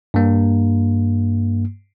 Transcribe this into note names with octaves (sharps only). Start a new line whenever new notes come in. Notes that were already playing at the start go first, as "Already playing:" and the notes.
G2 A#3